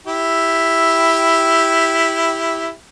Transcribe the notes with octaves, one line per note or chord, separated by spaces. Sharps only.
E4 G4